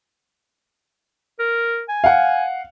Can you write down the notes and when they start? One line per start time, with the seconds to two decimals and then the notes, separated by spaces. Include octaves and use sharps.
1.39 A#4
1.89 G#5
2.04 F5 F#5